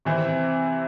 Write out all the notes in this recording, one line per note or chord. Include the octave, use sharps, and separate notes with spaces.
C3 E3 C4 E4